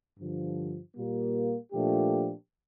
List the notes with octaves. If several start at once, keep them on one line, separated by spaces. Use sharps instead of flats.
G2 D3 F3
A#2 G3 A#3
A#2 F3 A3 D4 G4